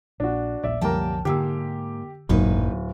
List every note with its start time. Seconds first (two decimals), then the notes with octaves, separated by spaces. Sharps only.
0.20 A#1 D4 F#4
0.64 D#1 A#1 D5 E5
0.81 C2 F#2 D3 F3 G3 A#3 G5 A5
1.25 G#2 D3 A#3 G4 E6
2.29 D1 G#1 F#2 A#2 A#3 D#4 B4